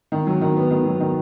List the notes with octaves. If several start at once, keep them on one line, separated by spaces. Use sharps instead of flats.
D#3
F#3
D#3
B3
D#3
F#3
D#3